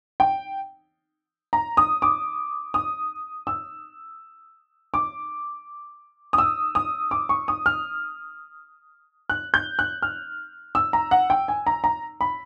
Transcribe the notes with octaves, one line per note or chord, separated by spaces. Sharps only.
G5
A#5
D#6
D6
D#6
E6
D6
D#6
E6
D#6
D6
C#6
D#6
F6
F#6
G6
F#6
F6
E6
A#5
F#5
G5
G#5
A#5
A#5
B5